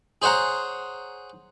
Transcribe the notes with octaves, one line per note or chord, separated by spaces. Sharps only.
G#4 C5 C#5 F#5 A#5